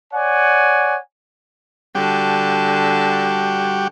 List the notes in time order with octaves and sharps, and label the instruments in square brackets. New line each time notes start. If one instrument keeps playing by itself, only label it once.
[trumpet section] C#5 D5 F#5 G#5
[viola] D3 A5 [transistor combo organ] G3 F#4 G4